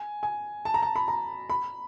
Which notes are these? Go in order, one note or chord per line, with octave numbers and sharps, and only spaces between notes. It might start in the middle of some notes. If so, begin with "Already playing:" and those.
Already playing: G#5
G#5
A5
A#5
A5
B5
A#5
B5